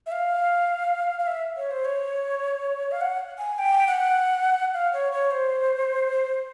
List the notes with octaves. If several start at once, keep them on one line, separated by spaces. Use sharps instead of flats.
E5
F5
F5
E5
C#5
C5
C#5
F5
F#5
G#5
G5
F#5
F5
C#5
C#5
C5